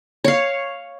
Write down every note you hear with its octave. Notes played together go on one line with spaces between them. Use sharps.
C#5 F5